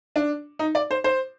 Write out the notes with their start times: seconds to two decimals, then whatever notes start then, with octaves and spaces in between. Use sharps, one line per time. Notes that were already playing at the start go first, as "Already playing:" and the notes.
0.16 D4
0.59 D#4
0.75 D5
0.91 C5
1.04 C5